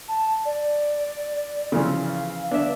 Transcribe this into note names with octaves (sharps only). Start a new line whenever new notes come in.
A5
D5
C#3 E3 F3
F5
D4 B4 E5